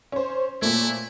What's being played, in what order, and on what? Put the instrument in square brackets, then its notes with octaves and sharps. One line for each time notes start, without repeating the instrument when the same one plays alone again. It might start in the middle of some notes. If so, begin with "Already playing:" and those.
[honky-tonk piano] C#4 C5
[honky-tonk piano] A#2 A3 [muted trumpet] E4